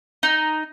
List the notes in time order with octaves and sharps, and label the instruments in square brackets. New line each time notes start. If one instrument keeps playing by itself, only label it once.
[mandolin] D#4